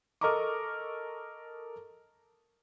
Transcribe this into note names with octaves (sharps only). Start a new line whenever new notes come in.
A4 A#4 D#5 A#5 C#6 D6